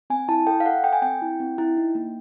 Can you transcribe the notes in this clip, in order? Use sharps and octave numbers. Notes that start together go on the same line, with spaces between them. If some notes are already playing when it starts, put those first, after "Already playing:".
C4 G#5
E4 A5
A4 G5
F5
A4 F#5
A4 G5
G#5
C4 G5
E4
C4
E4
D#4
A#3